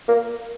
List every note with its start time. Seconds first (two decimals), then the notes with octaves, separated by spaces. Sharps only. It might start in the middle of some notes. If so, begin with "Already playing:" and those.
0.08 A#3